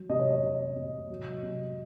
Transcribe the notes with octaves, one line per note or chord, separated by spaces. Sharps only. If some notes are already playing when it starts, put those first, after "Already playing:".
Already playing: F#3
C3 D#5
C#5
D#5
C3
C3
F#3
C3